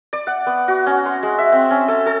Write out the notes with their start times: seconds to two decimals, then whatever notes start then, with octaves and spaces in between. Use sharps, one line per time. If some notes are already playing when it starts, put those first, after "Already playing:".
0.13 D5
0.27 F#5
0.46 B3
0.68 F#4
0.86 C#4
1.06 C6
1.23 G#3
1.38 E5
1.52 C4
1.70 C#4
1.88 A4
2.06 A4